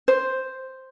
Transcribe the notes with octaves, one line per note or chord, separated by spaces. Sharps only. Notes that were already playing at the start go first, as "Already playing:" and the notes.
C5